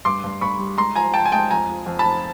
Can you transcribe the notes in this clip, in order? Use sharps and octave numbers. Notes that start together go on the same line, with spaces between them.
G2 C6 D6
G2
G2 B5 C#6
G3
G#3 A#5 C6
F3 G#5 A#5
F3 G5 A5
G#5
G#3 G5 A5
F2 G#5 A#5
F3
F2
A5 B5
F3